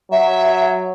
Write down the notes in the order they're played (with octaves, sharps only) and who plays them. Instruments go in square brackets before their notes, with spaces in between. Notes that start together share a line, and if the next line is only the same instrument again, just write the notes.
[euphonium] F#3 [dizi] E5